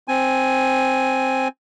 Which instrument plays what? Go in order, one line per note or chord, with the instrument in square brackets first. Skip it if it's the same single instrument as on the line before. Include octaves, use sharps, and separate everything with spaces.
[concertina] C4 G#5